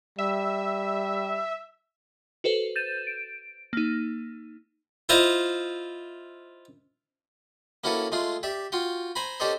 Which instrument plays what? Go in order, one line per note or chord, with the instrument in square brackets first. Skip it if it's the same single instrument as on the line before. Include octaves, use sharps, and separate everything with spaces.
[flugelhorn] G3 [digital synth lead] E5
[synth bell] F#4 A4 B4 C5
G6 A6 D#7 E7
D7
A#3 D#4
[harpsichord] E4 F4 C5 D#5 F5
A#3 C#4 E4 F#4 A4 B4
G#3 A3 F4 G#4
G4 D5 E5
F4 F#4 G5
C5 G#5 A#5 B5
C#4 G4 A4 C5 D5 D#5